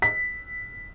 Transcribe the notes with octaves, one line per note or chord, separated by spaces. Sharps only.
B6